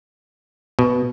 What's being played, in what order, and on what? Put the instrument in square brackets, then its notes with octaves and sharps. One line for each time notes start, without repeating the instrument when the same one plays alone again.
[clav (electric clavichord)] B2